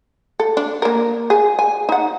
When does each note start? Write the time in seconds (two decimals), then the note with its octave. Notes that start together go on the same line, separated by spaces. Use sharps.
0.40 A4
0.57 D4
0.82 A#3 A#4
1.30 G#4
1.59 G#5
1.89 D#4 F#5